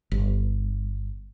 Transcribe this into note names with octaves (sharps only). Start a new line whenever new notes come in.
G1